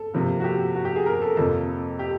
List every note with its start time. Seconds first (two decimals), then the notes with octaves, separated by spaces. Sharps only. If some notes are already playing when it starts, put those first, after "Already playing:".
Already playing: A4
0.14 C3 F3 A#3
0.40 F#4
0.44 G4
0.75 F#4
0.85 G4
0.96 G#4
1.06 A#4
1.22 A4
1.37 F2 C3 F3 A#3 A4
1.99 G4